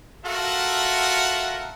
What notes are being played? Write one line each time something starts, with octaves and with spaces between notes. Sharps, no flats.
F4 F#4 A4 A#4 E5 F#5